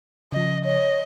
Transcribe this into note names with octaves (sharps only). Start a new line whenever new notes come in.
C#3 F3 D#5
C#5 D#5